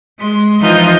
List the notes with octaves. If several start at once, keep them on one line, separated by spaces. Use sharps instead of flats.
G#3 C6
E3 F3 D#4 F4 D#5 G6